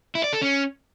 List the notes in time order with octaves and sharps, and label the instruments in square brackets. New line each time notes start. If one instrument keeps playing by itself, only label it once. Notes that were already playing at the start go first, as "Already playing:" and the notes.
[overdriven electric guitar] E4
D5
A4
C#4